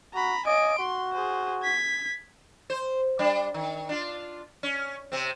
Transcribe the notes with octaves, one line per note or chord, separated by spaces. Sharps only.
F#4 A#5 B5
D#5 G#5 D7
F#4 C6
G#4 C5
G#6 B6
C5
G3 D4
D#3
D4 F4
C#4
C3 C4